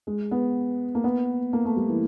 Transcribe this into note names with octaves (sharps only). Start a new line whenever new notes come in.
G#3
B3
A#3
B3
A#3
A3
G3
E3